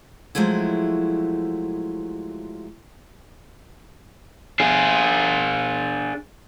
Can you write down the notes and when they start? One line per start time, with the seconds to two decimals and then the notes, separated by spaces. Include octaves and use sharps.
0.35 F3 F#3 G#3 A3 E4
4.60 D4 G#4